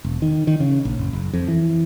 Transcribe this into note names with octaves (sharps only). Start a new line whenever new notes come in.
E1
D#3
D#3
C#3
A#1
F#1
F#1
F2
E3